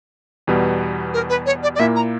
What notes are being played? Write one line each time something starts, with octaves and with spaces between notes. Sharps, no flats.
E2 B2 G3 B3
A#4
B4
C#5
D5
D5
A#2 A#3 E4 E5
A#5